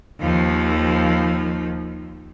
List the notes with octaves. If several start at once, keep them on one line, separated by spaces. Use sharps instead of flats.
D#2 F3